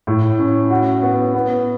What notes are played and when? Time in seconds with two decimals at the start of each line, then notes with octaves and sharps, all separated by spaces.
0.07 A2
0.39 C#4
0.70 F#4
1.03 B3
1.34 B3